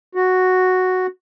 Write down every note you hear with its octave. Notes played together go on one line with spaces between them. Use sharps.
F#4